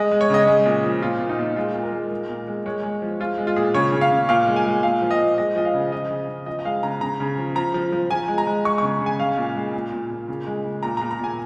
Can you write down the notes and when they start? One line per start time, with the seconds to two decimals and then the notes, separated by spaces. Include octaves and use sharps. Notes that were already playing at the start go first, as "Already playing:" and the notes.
Already playing: G#3 D#5
0.11 G#3
0.21 C#5
0.30 C#3 D#5
0.47 G#3
0.66 A#2
0.84 F3
1.02 A#2 F4
1.20 A#2
1.29 D#4
1.39 A#2
1.56 G#3 F4
1.75 A#2
1.83 A#4
1.93 G#3
2.11 G#3
2.29 A#2
2.47 G#3
2.66 G#3 C#5
2.83 G#3
3.02 F3
3.20 G#3 F4
3.38 G#3
3.47 F4
3.56 A#2 G#4
3.74 C#3 C#5
3.92 C#3
4.01 F5
4.11 C#3
4.29 A#2 F5
4.47 G#3
4.56 G#5
4.66 G#3
4.83 A#2 F5
5.02 F3
5.11 D#5
5.20 A#2
5.38 G#3 D#5
5.56 F3 D#5
5.65 F5
5.74 C#3
5.92 F3 D#5
6.11 C#3
6.29 C#3
6.46 F3 D#5
6.59 D#5
6.65 G#3 F5
6.83 C#3 A#5
7.01 C#3 A#5
7.20 C#3
7.37 F3
7.55 F3 A#5
7.74 F3
7.92 F3
8.10 F3 G#5
8.28 G#3
8.38 A#5
8.47 G#3
8.65 G#3 C#6
8.78 C#3 C#6
9.01 C#3
9.06 G#5
9.19 G#3 F5
9.38 A#2
9.55 G#3
9.74 A#2
9.92 A#2
10.10 A#2
10.28 C#3
10.46 G#3
10.64 C#3
10.83 A#2 A#5
10.97 A#2 A#5
11.11 A#5
11.19 A#2 G#5